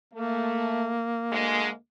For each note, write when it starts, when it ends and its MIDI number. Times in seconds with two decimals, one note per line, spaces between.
0.13 0.94 57
0.13 1.77 58
1.31 1.68 38
1.31 1.68 56